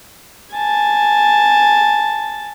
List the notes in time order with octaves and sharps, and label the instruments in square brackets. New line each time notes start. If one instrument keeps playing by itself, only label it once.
[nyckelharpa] G#5 A5